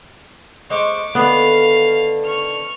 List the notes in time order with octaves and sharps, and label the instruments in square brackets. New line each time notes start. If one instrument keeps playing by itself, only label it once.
[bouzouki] G#3 C5 D#5 [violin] C#6 D6
[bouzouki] D3 D#3 [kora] B3 [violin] F5
[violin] C#6 F6